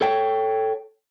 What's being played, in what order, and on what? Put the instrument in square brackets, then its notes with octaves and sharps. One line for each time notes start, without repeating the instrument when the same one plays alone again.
[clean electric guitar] A4 C#5 G5